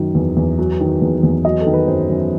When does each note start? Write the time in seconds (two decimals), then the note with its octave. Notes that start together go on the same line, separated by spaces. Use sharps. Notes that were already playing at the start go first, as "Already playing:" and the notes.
Already playing: F#2 D#3 F#3
0.15 E2
0.37 E2
0.59 F#3
0.81 D#3
1.02 E2
1.23 E2
1.45 F#3 D#5
1.61 A4
1.67 D#3
1.74 B4
1.87 F#2 C5
2.10 F#2